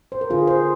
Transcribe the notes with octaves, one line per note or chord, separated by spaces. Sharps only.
C5
A#4
D3 F4 G#4
G#4 C5